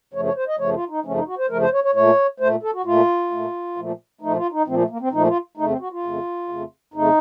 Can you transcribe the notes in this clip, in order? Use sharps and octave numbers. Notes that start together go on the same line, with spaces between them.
F#2 C#3 F3 A3 C#5
C#5
C5
D#5
F#2 C#3 F3 A3 C#5
F4
D#4
F#2 C#3 F3 A3 C#4
D#4
F#4
C5
F#2 C#3 F3 A3 A#4
C5
C#5
C#5
A#2 A3 C#5
A#2 A3 C5
A4
F#4
A#2 A3 F4
A#2 A3
A#2 F3 A3
A#2 F3 A3 D#4
F4
D#4
A#2 F3 A3 C4
A3
A#3
C4
A#2 F3 A3 D#4
F4
F2 C#3 A3 D#4
C4
F#4
F4
F2 C#3 A3
F2 C#3 A3
F2 C#3 A3 D#4